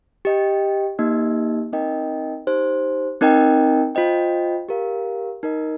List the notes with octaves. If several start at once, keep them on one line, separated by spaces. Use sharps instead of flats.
G4 D#5 G5
A#3 D#4 G4 D#5
C4 D#4 A#4 D#5 G5
D#4 G4 C5
C4 D#4 A#4 D#5 G5
F4 C5 D#5 G5
G4 A#4 F5
D#4 A#4 D#5